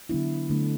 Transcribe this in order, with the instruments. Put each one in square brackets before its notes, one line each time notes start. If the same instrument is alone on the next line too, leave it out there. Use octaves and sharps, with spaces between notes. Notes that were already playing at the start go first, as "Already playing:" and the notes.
[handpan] D3 F#3 B3 D4 E4
D3 A3 D4